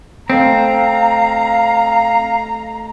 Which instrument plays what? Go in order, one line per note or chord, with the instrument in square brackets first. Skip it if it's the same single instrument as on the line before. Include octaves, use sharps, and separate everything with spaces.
[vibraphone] A3 A4 D#5 [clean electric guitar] C4 [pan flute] F5 [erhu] A#5